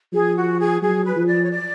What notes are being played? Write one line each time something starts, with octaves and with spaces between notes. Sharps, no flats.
F3 G#4
F#4
G#4
F#3 G#4
B4
F3
D5
C#5
D5